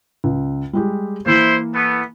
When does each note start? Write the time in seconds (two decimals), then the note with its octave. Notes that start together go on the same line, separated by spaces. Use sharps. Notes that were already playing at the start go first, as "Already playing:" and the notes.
0.24 C#2
0.73 G3 G#3 G4
1.26 E3 A#3 E4 C5
1.74 A3 B3